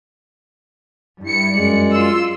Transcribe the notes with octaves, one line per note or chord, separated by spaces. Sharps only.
G2 E4 C#7
F#2 G#3 D5
F4 C6 E6